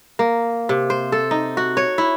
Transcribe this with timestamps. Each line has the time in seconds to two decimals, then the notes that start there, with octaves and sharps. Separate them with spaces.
0.19 A#3
0.69 C3
0.90 C5
1.12 A4
1.31 D#4
1.57 F#4
1.77 C#5
1.98 E4